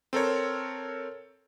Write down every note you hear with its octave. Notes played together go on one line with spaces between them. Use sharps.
C4 A4 A#4 C#5